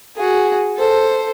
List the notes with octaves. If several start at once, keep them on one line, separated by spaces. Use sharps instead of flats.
F#4 G#4
A4 C5